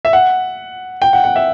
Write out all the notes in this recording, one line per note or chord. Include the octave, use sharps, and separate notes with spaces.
E5
F#5
G5
F#5
F#5
E5